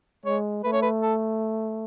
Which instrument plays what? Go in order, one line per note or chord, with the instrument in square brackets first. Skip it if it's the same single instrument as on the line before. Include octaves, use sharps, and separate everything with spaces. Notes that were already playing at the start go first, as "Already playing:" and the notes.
[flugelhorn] G#3 [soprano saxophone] C#5
[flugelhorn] A3 [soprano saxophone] B4
[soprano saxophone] C#5
B4
A4